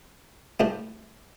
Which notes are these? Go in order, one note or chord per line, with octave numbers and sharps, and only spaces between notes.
C2 A#2 A3 D4 G4